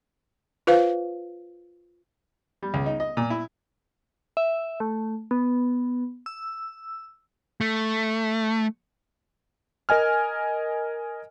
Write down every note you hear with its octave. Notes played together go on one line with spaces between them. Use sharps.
F4 B4 C5 F5
G3
C#2
D#4
D#5
A#2
E4
E5
A3
B3
E6
A3
A#4 D#5 G#5 F6